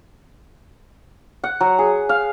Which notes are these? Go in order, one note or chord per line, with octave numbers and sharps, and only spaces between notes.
F#5
F#3
G#4
F5